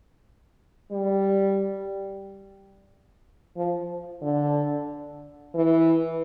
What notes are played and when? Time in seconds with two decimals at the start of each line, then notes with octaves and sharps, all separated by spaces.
0.91 G3
3.56 F3
4.22 D3
5.55 E3